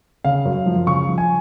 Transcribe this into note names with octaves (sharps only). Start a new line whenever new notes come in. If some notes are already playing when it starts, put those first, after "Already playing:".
C#3 F5
F#2
F3
C#3 C#6
F3
G#5